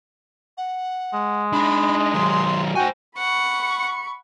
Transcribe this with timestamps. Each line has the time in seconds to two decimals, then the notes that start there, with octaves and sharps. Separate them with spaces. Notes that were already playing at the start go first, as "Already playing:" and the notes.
0.58 F#5
1.14 G#3
1.53 D4 D#4 B5
2.14 D#3 F#3 C6
2.75 F#4 C5 G5 G#5
3.18 F#5 B5 C#6